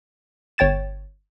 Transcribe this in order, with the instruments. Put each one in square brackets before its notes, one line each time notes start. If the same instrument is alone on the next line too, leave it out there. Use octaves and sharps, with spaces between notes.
[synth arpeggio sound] G1 C#5 G5 A6 E7